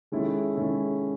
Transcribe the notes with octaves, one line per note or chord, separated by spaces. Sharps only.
D#3 G#3 C#4 E4 A4
D#3 G#3 C#4 E4 A4